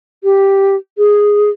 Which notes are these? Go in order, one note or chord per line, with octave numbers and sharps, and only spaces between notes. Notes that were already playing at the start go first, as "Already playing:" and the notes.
G4
G#4